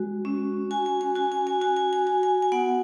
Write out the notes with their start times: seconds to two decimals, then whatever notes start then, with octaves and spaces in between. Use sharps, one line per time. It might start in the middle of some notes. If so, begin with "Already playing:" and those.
Already playing: G#3 F#4
0.25 C#4
0.71 F#4 G#5
0.86 G#5
1.01 G#5
1.15 F#4 G#5
1.32 G#5
1.47 G#5
1.61 F#4 G#5
1.77 G#5
1.93 G#5
2.07 F#4 G#5
2.23 G#5
2.42 G#5
2.52 B3 F#5